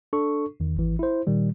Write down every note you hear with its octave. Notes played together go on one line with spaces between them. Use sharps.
D4 A4 C#6
E2 D#3
G#1 E3
E4 C5
A#2 D#3 G3